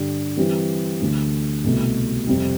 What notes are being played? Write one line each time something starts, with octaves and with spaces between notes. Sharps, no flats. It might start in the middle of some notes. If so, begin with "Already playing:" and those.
Already playing: G2 D3 G3 D4 G4
E3 G3 C4 G4
D2 D3 A3
C2 B2 A3
F2 C3 G3